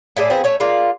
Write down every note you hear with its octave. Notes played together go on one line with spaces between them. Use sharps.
A2 E4 G#4 D5
F3 B3 C4 G#4
A3 C#4 C#5
G#3 A#3 F4 D5